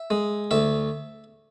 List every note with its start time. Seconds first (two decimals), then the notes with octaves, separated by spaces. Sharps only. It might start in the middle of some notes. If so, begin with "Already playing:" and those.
Already playing: E5
0.10 G#3
0.51 D2 E5